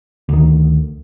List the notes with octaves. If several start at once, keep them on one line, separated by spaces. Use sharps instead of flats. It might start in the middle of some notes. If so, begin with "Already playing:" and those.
D2 D#3